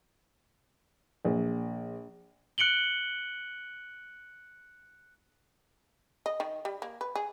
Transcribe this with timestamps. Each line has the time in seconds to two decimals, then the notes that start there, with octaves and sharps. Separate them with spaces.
1.25 A#1
2.58 F#6 C#7 D7 F#7 G7
6.26 D#5
6.40 D#3
6.65 G3
6.82 A#3
7.01 B4
7.15 G#4